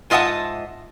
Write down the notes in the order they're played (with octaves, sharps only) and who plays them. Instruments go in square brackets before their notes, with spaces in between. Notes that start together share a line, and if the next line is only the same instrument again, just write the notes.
[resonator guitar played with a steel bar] G#2 F4 D#5 E5 F#5 A5